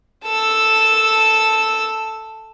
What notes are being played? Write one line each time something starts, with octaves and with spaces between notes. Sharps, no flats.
A4 E6